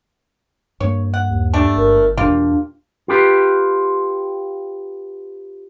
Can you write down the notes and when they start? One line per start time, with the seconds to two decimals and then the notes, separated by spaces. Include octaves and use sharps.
0.80 G2 A#3 C#5
1.14 F#5
1.30 D#2
1.54 G3 A3 D4
1.77 G1 A#4
2.17 E2 B2 G3 A#3 D4 F4
3.08 F4 G4 B4